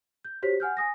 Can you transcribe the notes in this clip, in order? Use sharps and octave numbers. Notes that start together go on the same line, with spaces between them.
G6
F#4 G4 C5 C#5 B6
F#5 G#5 F6 G6
G#5 D#6 A#6